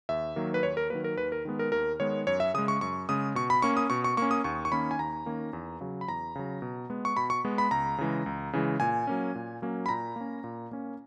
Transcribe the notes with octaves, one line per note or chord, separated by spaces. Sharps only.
D#2 E5
D#3 F#3 A#3
B4
D#2 C#5
A#4
D#3 F#3 A#3 B4
A#4
D#2 B4
A#4
D#3 G#3 B3
A#4
D#2 A#4
D#3 G#3 B3 C#5
F#2 C#5
E5
C#3 G#3 D#6
C#6
F#2 C#6
C#3 G#3 D#6
B2 C#6
B5
A#3 C#4 C#6
D#6
B2 C#6
C#6
A#3 C#4 C#6
D#6
D#2 C#6
C#6
D#3 A#3 C#4 B5
G#5
D#2 A#5
D#3 A#3 C#4
E2
C#3 F#3
B5
E2 A#5
C#3 F#3
B2
G#3 B3
C#6
B2 B5
C#6
G#3 B3
B5
C#2 A#5
C#3 E3 G#3
C#2
C#3 E3 G#3
A#2 G#5
F#3 A#3 C#4
A#2
F#3 A#3 C#4
B5
A#2 A#5
A#3 C#4
A#2
A#3 C#4